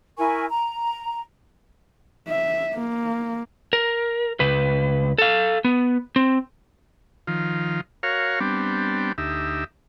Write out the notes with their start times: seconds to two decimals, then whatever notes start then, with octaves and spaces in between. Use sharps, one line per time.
0.18 E4 A#4 G#5 C#6
0.50 A#5
2.28 E5
2.75 A#3
3.73 A#4
4.40 C#2 B4
5.18 A4 F5
5.65 B3
6.16 C4
7.27 D#3 F3 F4
8.03 F#4 A#4 C#5 F5
8.40 G3 B3 C4 D4
9.18 D2 D#4 G4 E5